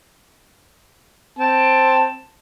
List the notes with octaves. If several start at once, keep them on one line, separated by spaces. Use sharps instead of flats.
C4 A5